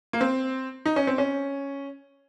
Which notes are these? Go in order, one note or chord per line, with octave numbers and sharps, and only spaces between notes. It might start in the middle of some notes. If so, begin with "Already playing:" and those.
A#3
C4
D#4
C#4
C4
C#4